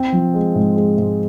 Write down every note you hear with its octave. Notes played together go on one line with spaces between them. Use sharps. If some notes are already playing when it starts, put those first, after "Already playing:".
Already playing: C4
F3
G#3
G#2
G#3
G#2